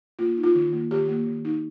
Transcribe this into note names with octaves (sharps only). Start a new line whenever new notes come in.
A#3 F4
D#4
F4
D#3
A#3
D#3 G4
A#3
D#3
D#4